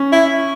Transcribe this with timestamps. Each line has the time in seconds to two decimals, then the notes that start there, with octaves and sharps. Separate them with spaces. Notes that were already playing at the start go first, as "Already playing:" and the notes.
Already playing: C#4
0.12 E4